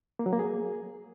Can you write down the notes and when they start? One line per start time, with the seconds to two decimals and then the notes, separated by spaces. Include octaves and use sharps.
0.19 A#3
0.26 F#3
0.33 A#3
0.39 G#4